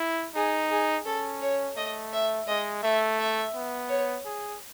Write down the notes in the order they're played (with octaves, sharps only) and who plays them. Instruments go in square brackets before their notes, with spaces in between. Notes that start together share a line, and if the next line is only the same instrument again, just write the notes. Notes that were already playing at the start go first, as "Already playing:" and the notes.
Already playing: [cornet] E4
[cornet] D#4 [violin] G#4
[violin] G#4
[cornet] C#4 [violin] A4
[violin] C#5
[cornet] A3 [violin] D#5
[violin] E5
[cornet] G#3 [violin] D#5
[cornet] A3 [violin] E5
[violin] E5
[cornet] B3
[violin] C#5
[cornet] G#4